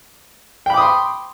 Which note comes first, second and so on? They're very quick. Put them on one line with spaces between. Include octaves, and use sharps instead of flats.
G5 B5 D6 D#6 C6